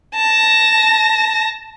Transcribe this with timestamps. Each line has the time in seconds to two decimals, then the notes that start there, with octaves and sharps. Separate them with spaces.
0.16 A5 A#6